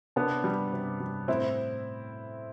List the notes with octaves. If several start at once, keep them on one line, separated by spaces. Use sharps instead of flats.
C3 B3 D4
G3
C3
G3
A2 C4 E4